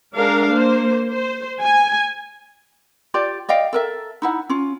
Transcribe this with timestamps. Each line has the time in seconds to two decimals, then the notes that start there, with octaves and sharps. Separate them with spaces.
0.13 G#3 D4 A#4 F5
0.51 A#3 C5
1.08 C5
1.61 G#5
3.14 F4 G4 D5
3.49 D5 D#5 F5 G5
3.73 A4 A#4 E5
4.22 D#4 E4 F#5
4.49 C#4 F4